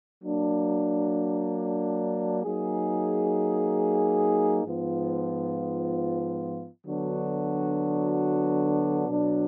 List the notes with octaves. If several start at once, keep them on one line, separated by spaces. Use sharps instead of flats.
F#3 A#3 D4
F#3 A#3 D#4 G#4
G#2 F3 B3 F4
D3 F#3 B3 D4 F#4
B2 F#3 D4